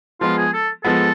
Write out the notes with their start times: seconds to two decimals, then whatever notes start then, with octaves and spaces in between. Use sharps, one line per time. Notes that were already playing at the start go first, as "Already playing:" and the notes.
0.21 F3 G#3 B3 F4
0.37 G#4
0.53 A4
0.84 F3 G#3 B3 A4